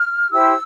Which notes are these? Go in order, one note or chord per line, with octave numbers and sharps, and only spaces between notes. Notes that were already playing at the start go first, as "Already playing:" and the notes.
Already playing: F6
E4 G4 C5 E6